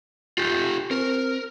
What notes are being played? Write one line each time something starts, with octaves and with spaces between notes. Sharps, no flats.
F4 G4
C4 A#4